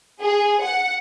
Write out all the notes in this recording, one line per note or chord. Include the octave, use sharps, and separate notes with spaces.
G#4
F#5